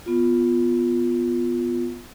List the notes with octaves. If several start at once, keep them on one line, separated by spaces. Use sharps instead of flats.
B3 F4